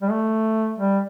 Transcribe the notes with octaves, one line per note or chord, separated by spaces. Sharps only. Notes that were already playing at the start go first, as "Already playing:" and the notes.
G3
A3
G3